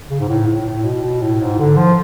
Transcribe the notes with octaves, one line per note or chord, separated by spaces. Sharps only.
C#3
G#2
A2
A2
A2
B2
B2
A2
G#2
D3
F3